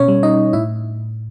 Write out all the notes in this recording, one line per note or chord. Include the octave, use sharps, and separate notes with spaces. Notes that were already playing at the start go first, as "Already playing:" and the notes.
Already playing: B2 C#4 C#5
G3
D#4 D#5
A2 E4 E5